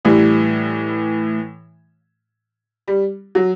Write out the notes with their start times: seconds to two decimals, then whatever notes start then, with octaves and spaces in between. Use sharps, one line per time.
0.05 A2 E3 G3
2.88 G3
3.35 F#3